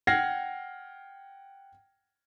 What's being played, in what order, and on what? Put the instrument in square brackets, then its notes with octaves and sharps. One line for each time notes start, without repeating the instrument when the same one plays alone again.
[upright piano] F#5 G5 F6 G#6 A#6 C7